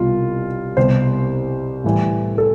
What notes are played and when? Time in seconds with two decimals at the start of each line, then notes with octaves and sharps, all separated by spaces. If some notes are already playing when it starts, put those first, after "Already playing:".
Already playing: C2 B2 G3 F4
0.77 C2 B2 G3 C5
1.84 A2 E3 G3
2.38 A4